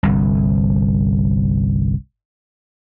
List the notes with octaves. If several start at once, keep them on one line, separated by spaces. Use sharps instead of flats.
G1 C2